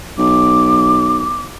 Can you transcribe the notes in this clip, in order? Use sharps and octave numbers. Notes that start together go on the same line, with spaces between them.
B1 D6